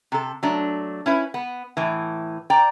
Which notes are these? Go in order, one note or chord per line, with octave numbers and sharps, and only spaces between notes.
C3 A4
F#3 A3 D4
C#4 E4 B4
B3
A2 E3
D5 G5 A#5